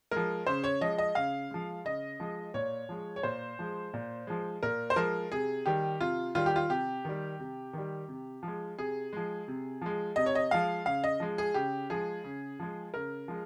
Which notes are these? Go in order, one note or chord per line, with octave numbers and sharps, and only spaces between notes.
F3 G#3 A#4
C#3 C5
C#5
F3 G#3 D#5
D#5
C#3 F5
F3 G#3
C#3 D#5
F3 G#3
A#2 C#5
F3 G#3
C#5
A#2 C5
F3 G#3
A#2
F3 G#3
A#2 A#4
C5
F3 G#3 A#4
C3 G#4
D#3 G3 G4
C3 F4
D#3 G3 F4
G4
F4
C3 G4
D#3 G3
C3
D#3 G3
C3
F3 G#3
C3 G#4
F3 G#3
C3
F3 G#3
C3 D#5
C#5
D#5
F3 G#3 F5
C#3 F5
D#5
F3 G#3
G#4
C#3 G4
F3 G#3 G#4
C#3
F3 G#3
C#3 A#4
F3 G#3